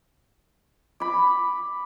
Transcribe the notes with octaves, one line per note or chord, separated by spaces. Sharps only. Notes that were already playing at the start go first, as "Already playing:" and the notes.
B5 D6